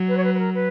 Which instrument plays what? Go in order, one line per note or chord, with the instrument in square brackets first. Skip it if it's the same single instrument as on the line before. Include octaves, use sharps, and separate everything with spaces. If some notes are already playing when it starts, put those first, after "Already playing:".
Already playing: [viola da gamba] F#3
[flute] B4
C#5
B4
B4
A#4
B4